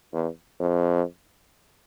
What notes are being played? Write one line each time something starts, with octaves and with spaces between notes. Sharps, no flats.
E2
F2